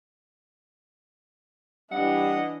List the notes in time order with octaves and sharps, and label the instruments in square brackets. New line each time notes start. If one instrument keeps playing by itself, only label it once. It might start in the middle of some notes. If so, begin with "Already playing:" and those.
[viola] E3 D4 [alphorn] G3 [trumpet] D#5 [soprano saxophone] F#5